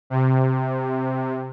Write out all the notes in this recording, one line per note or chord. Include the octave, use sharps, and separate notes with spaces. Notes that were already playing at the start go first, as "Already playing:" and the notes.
C3